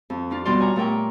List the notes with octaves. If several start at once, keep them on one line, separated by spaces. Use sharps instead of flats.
F2
F3 D4 F4
B2 G3 D4 F4 D5 C6
C#5 G#5 A#5
A#2 A3 G4 A#4 G5 C#6